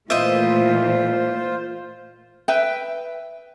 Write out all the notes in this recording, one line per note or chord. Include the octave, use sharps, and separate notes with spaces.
A#2 E3 A3 F4 C5 D#5 E5
B4 E5 G5